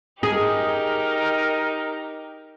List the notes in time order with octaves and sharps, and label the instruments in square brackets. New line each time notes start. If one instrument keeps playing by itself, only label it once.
[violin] D#4 G4 [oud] G#4 [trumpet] A#4